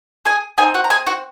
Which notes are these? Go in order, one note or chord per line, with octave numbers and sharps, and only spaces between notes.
G#4 G#5
C4 D#4 G#4 G#5
F#4 F#5
A#5
G#4 G#5
F#4 F#5